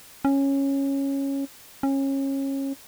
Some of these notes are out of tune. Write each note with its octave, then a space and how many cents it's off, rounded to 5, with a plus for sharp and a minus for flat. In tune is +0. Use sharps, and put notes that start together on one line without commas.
C#4 -10
C#4 -25